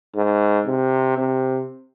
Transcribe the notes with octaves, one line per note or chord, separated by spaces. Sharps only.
G#2
C3
C3